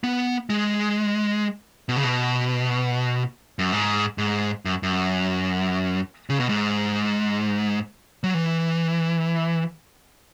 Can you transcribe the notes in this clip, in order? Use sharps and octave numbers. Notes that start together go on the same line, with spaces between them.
B3
G#3
B2
C#3
B2
F#2
G#2
G#2
F#2
F#2
C#3
B2
G#2
F#3
E3